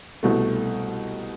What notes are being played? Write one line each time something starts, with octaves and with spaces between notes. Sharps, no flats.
C2 B2 A3